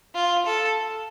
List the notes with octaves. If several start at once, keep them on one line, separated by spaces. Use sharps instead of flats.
F4
A4